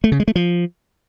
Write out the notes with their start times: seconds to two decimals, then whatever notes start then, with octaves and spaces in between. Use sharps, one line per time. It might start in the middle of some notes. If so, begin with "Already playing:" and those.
0.04 A3
0.12 C#3
0.20 G#3
0.28 A3
0.36 F3